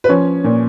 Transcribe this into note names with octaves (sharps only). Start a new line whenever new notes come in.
B4
F3 C#4 C#5
A#2